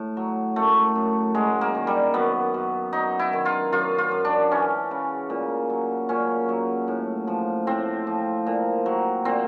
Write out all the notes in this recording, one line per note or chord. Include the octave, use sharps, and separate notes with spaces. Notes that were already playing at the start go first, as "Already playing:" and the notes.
Already playing: A2
F#3
F#2 A3
F#2
F#3 G#3
A#3
D#3
G3
F#2 B3
F#2
F#3 D#4
E4
D#3
F4
F#2 F4
F4
F#2
D4
E3 C#4
C#3
A#2
F#3
A#2 C#4
F#3
A2
F3
A2 C4
F3
A#2
F#3
A#2 C4